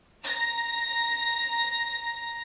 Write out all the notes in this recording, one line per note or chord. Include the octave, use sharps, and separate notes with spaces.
A#5 A#6